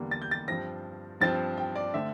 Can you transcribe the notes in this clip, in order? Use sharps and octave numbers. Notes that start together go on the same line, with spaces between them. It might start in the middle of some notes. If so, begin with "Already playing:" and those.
Already playing: E2 D3 G3 A#3
A6
G6
A6
G2 F3 C4 A#6
G2 F3 C4 A6
G5
D5
D3 A3 C4 E5